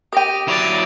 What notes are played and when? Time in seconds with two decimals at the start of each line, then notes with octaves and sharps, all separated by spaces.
0.13 G4 A#4 G5 D#6 A#6 D#7
0.48 F#3 E4 D5 D6 A6 D7 F7